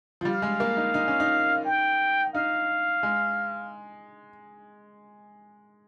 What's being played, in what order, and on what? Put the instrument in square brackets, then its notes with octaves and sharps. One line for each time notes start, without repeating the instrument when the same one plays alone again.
[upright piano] F3
[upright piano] G3 [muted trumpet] F5
[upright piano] G#3
A#3
D#4
D#4
C#4
D#4
[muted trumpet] G5
[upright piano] D#4 [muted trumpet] F5
[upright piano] G#3